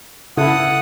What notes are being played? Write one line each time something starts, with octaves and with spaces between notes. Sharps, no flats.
C#3 E4 A4 F#5 D#6